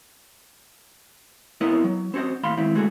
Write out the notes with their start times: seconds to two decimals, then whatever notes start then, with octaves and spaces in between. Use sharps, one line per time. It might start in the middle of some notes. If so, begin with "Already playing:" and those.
1.61 B3 C4 E4 A#4 D#5
1.84 F#3
2.14 C4 C#4 F#4 C5 D#5
2.43 D#2 A2 F5 B5 C6
2.57 D#3 G#3 C4 E4
2.75 D3 G#3 A3 F#4 G#4